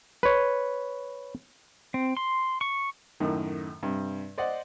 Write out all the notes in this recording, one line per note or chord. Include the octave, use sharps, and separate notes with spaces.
B4 C#5
C4
C6
C#6
F#2 A2 D#3
G2 C3
C5 D5 D#5 F#5